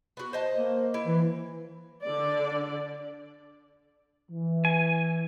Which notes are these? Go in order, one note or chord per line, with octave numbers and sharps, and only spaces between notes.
B3 F#4
C5 D#5 A5
A#3
E4
E3
D3 D5
E3
G#5